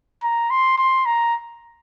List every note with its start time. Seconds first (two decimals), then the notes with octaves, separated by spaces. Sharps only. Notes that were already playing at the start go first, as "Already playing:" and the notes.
0.23 A#5
0.50 C6
0.78 C6
1.06 A#5